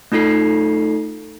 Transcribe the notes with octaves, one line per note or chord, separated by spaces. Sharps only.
A3 D#4 F4 A4 C7